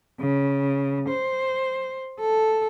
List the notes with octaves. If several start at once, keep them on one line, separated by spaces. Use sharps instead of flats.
C#3
C5
A4